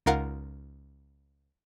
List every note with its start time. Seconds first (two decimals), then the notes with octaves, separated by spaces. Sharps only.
0.06 C#2 D#4 F4 A#4 F5 F#5